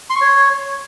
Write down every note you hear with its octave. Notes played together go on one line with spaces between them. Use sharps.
C6
C#6
C#5